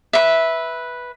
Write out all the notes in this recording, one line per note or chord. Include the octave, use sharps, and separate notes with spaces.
B4 E5